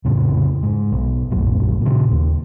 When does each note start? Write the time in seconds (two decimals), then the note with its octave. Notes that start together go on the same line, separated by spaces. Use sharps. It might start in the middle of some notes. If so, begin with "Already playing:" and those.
0.05 F2 A2 C#3
0.63 G#2
0.92 B1
1.31 D1 A#1 F#2
1.81 A#2 C#3
2.11 D#2